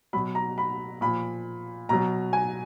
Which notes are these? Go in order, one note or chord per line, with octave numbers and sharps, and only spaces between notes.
B2 F#3 B5
A#5
B5
A#2 F3 B5
B2 F#3 A#5
G#5